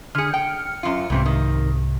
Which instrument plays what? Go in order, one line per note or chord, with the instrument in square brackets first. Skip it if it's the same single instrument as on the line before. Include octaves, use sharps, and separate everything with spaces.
[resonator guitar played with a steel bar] D3 G#4 [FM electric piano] F6 C#7
[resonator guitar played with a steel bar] G5
F#2 F4
[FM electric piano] C2 G#2 C3 [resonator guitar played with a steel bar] F2 E3 C4
[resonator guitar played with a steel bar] D#3